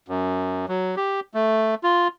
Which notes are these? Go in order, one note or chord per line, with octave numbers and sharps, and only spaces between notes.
F#2
F#3
G4
A3
F4